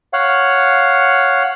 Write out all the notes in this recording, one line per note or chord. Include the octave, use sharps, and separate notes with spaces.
C#5 F5 F#5